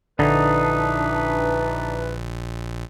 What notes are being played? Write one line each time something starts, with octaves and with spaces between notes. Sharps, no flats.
A#1 D3 E3 D4 D#4 B4